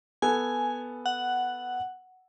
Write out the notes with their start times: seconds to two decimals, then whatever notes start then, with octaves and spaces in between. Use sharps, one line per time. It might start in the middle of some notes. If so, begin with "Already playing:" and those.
0.22 B3 A4 G#5
1.06 F#5